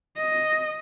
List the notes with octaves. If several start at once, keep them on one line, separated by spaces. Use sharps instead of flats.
D#5